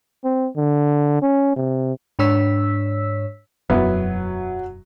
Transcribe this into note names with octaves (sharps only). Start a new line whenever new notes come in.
C4
D3
C#4
C3
G#2 D4 C#5 E6 B6
E1 F#2 F#3 B3 E4